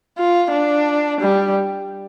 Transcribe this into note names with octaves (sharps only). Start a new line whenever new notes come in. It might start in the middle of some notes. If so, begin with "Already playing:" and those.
F4
D4
G3